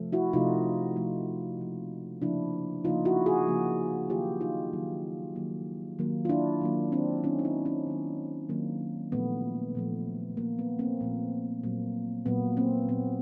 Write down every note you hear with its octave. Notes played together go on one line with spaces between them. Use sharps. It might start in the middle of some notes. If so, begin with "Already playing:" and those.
Already playing: C3 F3 A3
E4 F#4
C3 F3 A3 D#4 F4
C3 F3 A3
C#3 F3 A#3
C#3 F3 A#3 D4 E4
C#3 F3 A#3 D#4 F4
E4 F#4
F#4 G#4
C#3 F3 A#3
D#3 F#3 A#3 F4 G4
D#4 F4
D#3 F#3 A#3
D#3 F#3 A#3
D#3 F#3 A#3
F4
D4 E4
D#3 F#3 A#3
C4 D4
D#3 F#3 A#3 C#4 D#4
D#4
D4 E4
C#4 D#4
D#3 F#3 A#3
D#3 F#3 A#3
A#2 F3 A3 B3
A#2 F3 A3
A#2 F3 A3 A#3
B3
A#3 C4
A#2 F3 A3
A#2 F#3 A#3
A#2 F#3 A#3 B3
A#3 C4
A#2 F#3 A#3 B3